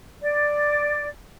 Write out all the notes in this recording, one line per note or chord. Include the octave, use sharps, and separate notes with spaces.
D5